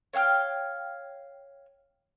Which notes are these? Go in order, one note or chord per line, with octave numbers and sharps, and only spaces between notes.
C#5 F5 G5 F6